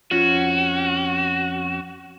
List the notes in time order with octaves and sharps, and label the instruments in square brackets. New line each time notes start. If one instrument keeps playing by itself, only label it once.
[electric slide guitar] F2 C#4 [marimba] F4 [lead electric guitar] F#4